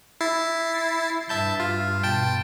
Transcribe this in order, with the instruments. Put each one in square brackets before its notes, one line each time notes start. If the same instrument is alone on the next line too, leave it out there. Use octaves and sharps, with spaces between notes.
[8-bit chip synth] E4 A6 C7
[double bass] G2 [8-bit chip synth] E5 A5 G6
[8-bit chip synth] F4
[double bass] B2 [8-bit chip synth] G5 A5 A6